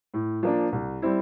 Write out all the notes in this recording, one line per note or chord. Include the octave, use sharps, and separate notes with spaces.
A2
F3 A#3 D4
C2
G3 C4 E4